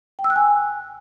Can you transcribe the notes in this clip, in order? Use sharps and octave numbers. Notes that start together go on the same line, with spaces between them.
G5
E6
F#6
G#5